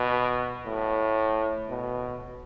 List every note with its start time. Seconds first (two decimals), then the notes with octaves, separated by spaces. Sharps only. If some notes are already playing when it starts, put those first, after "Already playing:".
Already playing: B2
0.66 A2
1.70 B2